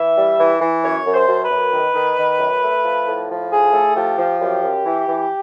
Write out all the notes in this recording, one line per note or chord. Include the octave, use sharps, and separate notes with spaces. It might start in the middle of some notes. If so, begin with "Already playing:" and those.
Already playing: E3 E5
G3
E3
E3
F#2 C#5
F#2
C5
F#2
B4
F#2
D#3
D#3
D#3
F#2
A3
F3
A2
F3
A2 G#4
A3
F3 G4
F3
F#2 G4
F#2
E3
E3